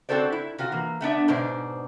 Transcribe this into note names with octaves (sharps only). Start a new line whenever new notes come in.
C4 F#4 A4 C5 D5
E4
C3 F4 F#4
E3 A#3
A3 B3 D4 E5
G#2 B2 D4 C5